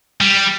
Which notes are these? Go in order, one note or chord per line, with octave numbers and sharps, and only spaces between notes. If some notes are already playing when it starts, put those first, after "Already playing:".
G3